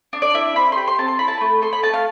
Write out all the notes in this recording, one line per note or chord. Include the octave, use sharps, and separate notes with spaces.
D4
D5
E4 E5
C4 B5
C6
G4 B5
C6
C4 A5
C6
E4 B5
A5
A3 B5
A4 C6
B5
A3 A5
F5